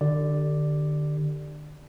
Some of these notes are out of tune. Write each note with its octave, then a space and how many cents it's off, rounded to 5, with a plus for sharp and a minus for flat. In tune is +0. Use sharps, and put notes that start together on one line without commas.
D3 +30 G4 -5 D5 +0